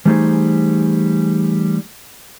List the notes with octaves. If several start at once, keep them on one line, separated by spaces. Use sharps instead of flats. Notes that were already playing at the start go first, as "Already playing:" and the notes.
E3 G3 A3 D#4 G#4 C5